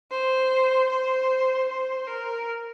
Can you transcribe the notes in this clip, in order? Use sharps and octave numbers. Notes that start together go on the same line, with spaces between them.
C5
C5
C5
A#4